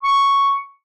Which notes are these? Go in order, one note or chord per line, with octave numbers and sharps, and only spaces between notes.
C#6